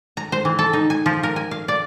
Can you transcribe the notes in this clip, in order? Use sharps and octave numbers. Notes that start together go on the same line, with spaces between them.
A#5
C5
E3
A4
D#4
G#5
F3
A#4
G#5
F5
D5